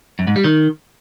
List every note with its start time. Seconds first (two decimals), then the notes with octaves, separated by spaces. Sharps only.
0.19 F#2
0.27 G#2
0.36 G3
0.44 D#3